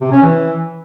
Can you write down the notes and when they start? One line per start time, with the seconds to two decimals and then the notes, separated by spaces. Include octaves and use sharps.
0.01 C3
0.12 C#4
0.23 E3